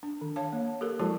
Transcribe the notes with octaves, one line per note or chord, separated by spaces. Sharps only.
D4
D#3
C#5 F5 A5
A#3
G4 A4 A#4
F3 G#3 E4 F#4 A4 A5